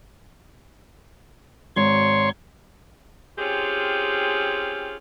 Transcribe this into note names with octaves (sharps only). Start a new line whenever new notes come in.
G#1 C#5 C6 C#6
C4 C#4 F4 G4 G#4